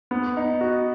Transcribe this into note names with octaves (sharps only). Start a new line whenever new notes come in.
B3
D#4
F#4